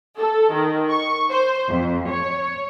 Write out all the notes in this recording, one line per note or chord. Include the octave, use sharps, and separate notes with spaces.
A4
D#3
C#6
C5
F2
C#5